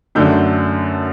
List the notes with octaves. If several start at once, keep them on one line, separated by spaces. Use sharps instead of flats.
F#2 D3 A3 D4 G6